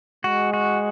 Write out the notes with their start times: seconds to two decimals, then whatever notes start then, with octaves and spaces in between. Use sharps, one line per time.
0.24 G#3 F#4
0.53 F#4